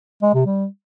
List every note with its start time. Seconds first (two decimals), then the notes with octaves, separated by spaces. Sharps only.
0.22 G#3
0.34 C3
0.46 G3